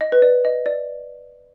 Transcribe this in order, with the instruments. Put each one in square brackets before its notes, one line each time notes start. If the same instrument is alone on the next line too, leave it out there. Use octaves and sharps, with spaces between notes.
[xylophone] D#5
B4
D5
D#5
D5